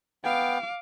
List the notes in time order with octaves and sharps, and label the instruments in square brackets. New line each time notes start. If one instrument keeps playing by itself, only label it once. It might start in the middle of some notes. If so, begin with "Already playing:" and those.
[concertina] B3 G5 [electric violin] F5 D6